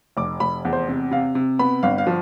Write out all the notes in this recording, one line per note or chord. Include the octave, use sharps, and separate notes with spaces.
F1 D6
F1 B5
E2
C5
C3
C3 F5
C3
B3 B5
G1 F5
F5
F3